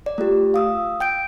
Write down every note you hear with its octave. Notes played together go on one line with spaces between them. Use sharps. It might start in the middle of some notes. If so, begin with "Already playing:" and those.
D5
A3 F4 G4
F5 D#6 E6
G5 G6 D7